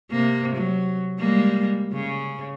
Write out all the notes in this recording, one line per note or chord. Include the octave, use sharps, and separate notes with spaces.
C3 A#3
F#3
G3 G#3 A#3
C#3